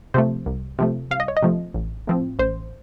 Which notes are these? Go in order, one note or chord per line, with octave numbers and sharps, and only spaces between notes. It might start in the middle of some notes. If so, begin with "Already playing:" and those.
C3 F3 A3 C5
C2
C3 F3 A3
C2 F5
D#5
C#5
D#5
C3 F3 A3
A1
A2 F3 C4
A1 C5